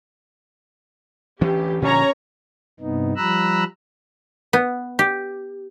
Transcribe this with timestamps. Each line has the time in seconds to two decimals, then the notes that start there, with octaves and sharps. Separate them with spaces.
1.41 D2 E3 C#4 G4
1.82 A#2 D3 F3 C#4 C#5 A#5
2.80 G2 C3 B3 D#4
3.17 F3 G3 A#5 B5 E6 F#6
4.53 B3
4.99 G4